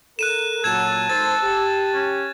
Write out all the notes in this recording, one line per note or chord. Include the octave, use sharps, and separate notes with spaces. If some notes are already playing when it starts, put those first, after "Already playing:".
A4 A#4 F#6 D#7 E7
A#2 F#3 A4 A5 G#6 E7
G#1 A4 C5 A6
G4
C#4